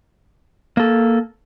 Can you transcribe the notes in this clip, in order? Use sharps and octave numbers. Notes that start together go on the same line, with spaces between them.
A#3 A4